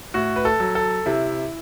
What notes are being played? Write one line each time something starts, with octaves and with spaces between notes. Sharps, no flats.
A2 F#4
B4
A4
F#3
A4
C3 E4